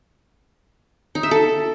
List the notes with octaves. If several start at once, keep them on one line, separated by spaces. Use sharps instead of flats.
D#4
E5
A4